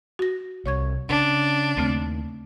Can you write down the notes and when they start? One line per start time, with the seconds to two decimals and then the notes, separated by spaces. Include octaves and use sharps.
0.19 F#4 A#6
0.66 C2 C#5 C#6 G#6
1.10 C#3 D4
1.77 D#2 C#3 A3 C4